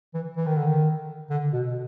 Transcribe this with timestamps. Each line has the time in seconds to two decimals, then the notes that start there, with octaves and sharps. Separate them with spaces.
0.14 E3
0.36 E3
0.46 D#3
0.56 D3
0.66 D#3
1.30 D3
1.53 B2
1.66 B2